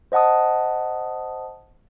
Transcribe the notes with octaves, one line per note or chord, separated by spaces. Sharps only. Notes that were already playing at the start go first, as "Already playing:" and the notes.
C5 D#5 F#5 A5 D#6